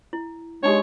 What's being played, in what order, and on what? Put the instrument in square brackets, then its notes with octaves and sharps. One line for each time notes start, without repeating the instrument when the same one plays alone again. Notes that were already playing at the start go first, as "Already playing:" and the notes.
[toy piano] E4
[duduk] G#3 [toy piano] D4 D#4 G4 [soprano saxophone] C#5